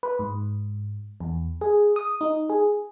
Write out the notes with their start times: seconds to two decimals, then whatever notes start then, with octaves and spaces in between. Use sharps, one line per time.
0.03 B4
0.19 G#2
1.20 E2
1.61 G#4
1.96 D#6
2.21 D#4
2.50 G#4